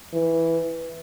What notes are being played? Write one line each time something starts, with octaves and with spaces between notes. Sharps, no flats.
E3